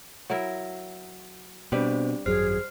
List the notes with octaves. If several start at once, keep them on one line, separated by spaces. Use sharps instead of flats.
F#3 E4 A#4
B2 G3 C4 D4 B4 C5
G#1 F#2 F#3 G#4 C5 F6 C7